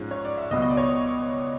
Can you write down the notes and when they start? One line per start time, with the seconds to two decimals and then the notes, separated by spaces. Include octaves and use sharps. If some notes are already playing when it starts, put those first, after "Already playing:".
Already playing: G#2 F3 G#3 C#4
0.11 C#5
0.25 D5
0.38 E5
0.51 C#2 B2 F#3 B3 D#5
0.62 D#5
0.70 D5
0.77 C#5